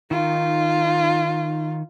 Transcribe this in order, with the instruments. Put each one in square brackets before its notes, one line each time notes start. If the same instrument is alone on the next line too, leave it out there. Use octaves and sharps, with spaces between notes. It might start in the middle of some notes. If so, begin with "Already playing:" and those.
[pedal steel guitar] D#3 [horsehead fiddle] D#4 F4